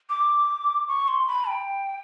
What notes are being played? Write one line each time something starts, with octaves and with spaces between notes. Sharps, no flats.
D6
C#6
C6
B5
G5